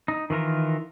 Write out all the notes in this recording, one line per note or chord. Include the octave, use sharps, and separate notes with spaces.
D#4
D#3 E3 F4 A#4